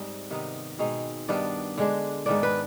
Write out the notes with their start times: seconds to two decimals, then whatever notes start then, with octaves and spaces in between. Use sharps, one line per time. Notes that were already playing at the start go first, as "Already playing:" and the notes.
Already playing: G#2 G3 C4 D#5
0.30 C3 D#3 B3 D#4
0.79 B2 G#3 C4 D#4
1.28 G2 D#3 B3 D4 D5
1.78 D3 G#3 D4
2.26 G#2 D#3 B3 D4 D5
2.43 B4